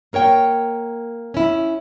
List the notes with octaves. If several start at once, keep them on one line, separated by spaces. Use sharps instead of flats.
A#3 A#4 C#5 G5
C#4 E4